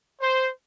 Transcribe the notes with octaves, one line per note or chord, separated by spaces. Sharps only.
C5